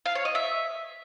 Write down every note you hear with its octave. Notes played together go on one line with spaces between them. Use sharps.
F5
C#5
D#5
E5